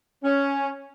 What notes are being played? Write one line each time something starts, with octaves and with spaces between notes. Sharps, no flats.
C#4